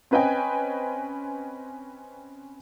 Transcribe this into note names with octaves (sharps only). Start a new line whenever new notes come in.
C4 C#4 B4 D#5 G5 G#5